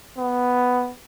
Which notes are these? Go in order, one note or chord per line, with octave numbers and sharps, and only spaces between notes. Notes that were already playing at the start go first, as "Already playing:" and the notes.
B3